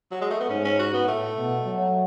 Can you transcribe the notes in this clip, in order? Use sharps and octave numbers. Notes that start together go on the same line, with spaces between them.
F#3
G#3
A3
B3
G#2 C#4
C#4
F#4
B3
A2 A3
B2
F#3